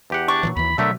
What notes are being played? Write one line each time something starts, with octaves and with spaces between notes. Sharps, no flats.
E2 G4 F#5
D4 C#6
A#2 D3 E3 F#3
D#2 E3 B5
B2 D3 F#3 A3 A#4 E5